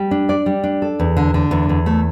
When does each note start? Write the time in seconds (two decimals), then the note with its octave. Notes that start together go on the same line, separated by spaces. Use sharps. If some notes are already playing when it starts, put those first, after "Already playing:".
Already playing: G3
0.11 D4
0.29 D5
0.46 G3
0.64 D4
0.82 A4
1.00 E2
1.17 D3
1.34 D3
1.51 E2
1.69 E2
1.86 A3